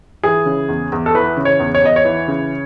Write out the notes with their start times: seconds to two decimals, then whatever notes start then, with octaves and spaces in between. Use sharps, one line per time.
0.23 E3 G#4
0.46 C#3
0.69 E2
0.92 E2
1.06 A4
1.14 E3 B4
1.37 C#3
1.45 C#5
1.60 E2
1.75 C#5
1.82 E2 D#5
1.96 C#5
2.05 E3
2.28 C#3